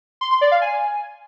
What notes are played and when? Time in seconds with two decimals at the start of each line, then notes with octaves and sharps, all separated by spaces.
0.21 C6
0.31 C6
0.41 D5
0.51 F5
0.62 G#5